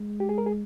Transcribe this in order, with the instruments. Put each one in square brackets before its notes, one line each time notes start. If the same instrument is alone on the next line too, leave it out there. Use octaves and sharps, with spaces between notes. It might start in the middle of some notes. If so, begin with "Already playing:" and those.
Already playing: [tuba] G#3
[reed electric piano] G4
G#4
A#4
G#4